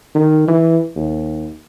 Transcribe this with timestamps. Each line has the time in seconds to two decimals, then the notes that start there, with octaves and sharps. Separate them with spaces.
0.15 D#3
0.48 E3
0.96 D#2